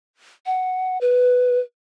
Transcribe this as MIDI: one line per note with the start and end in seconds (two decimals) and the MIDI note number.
0.46 1.00 78
1.01 1.60 71